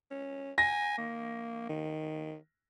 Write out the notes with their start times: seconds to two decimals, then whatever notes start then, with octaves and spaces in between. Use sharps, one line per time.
0.11 C#4
0.58 G#5 A#6
0.98 A#3
1.69 D#3